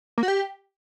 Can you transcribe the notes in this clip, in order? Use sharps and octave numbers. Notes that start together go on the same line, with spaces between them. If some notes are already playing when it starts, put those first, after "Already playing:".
A#3
F#4
G4